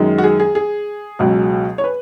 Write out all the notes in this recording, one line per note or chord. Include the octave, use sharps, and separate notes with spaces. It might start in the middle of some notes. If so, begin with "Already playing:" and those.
Already playing: F#2 D#3 G#3
F#4
G#4
G#4
G#4
C#2 B2 F#3
C#5
B4